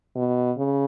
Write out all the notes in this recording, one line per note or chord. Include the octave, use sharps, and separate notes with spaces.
B2
C#3